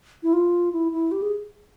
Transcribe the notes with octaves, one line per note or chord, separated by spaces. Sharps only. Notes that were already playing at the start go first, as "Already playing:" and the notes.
E4
F4
E4
E4
G4
G#4